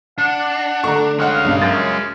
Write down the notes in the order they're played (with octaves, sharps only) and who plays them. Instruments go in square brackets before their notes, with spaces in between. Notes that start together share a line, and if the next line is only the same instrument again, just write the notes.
[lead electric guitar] D4 [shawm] F#5
[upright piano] D3 A3 [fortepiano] A#5 C#6
[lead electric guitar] G#3 C#5 [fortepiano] F#5 F6 F#6
[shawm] F5
[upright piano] B1 G2 [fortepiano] C#3
[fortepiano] F#2 [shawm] C#4 [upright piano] A6